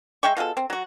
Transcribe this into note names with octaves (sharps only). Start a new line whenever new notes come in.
G#3 E5 G5 C#6
B2 F4 G#4 A4
C4
F#3 F#4